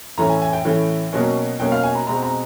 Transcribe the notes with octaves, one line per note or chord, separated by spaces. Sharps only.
A2 E3 A3 C#4 A#5
G#5
G#5
G5
A2 E3 A3 C#4
B2 F#3 A#3 C#4
B2 F#3 A#3 C#4 G5
F5
G#5
A#5
B2 G#3 C4 A#5
A#5